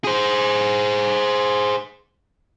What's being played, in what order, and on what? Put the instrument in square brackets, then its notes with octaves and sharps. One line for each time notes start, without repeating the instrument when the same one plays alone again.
[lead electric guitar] G#4 C5